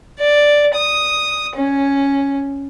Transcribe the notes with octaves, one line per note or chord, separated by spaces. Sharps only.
D5
D#6
C#4